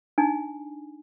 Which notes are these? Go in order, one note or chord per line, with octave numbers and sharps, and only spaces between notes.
D4 D#4 G#5